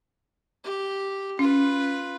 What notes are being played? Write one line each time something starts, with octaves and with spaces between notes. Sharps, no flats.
G4
C#4 F4 B4